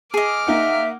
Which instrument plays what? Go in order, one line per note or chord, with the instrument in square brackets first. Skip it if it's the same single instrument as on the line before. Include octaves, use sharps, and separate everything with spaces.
[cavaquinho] G#4 D#5 [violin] D6 F6
[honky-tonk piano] A#3 D#4 F#5 [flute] E5